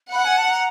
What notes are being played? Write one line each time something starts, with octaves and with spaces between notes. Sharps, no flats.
F#5 B5
G#5
A5
A#5